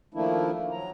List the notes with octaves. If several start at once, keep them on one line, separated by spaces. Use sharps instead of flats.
D#3 F3 A3 A#3 D4 E4
F#3 A#5